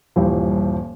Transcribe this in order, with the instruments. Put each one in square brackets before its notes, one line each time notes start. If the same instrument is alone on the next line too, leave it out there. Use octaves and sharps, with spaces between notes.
[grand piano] D#1 G2 E3 F3 E4 G4